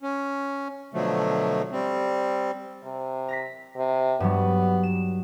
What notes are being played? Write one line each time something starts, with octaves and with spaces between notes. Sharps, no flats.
C#4
B2 D3 F3 F#3 A3
G3 C4
C3
A#5 A#6 B6
C3
G2 F#3 G3 B3
E7